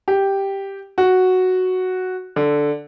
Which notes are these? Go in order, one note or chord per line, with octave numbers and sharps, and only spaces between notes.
G4
F#4
D3